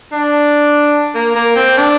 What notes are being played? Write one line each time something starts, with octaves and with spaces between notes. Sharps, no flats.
D4
A#3
A#3
C4
D4